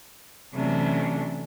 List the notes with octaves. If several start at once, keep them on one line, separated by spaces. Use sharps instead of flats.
C3 E3 F#3 A3 C#4 D4